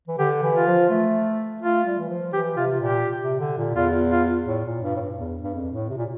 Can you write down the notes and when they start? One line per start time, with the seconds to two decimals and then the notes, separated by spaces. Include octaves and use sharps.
0.08 E3
0.18 D3 G4
0.43 E3
0.54 F4
0.66 F3
0.90 A3
1.61 A3 F4
1.85 G3
1.98 E3
2.09 F3
2.33 E3 G4
2.57 C3 F4
2.80 A#2 G4
3.22 C3
3.40 D3
3.57 A#2
3.76 E2 F4
4.11 F4
4.47 A2
4.65 A#2
4.82 G2
4.96 A2
5.01 G2
5.19 E2
5.43 G2
5.54 F2
5.72 A2
5.90 C3
5.97 A#2